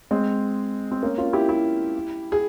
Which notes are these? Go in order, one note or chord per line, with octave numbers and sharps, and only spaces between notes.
G#3 C4
C4
A#3 C#4
C#4 F4
E4 G4
E4 G4
G#4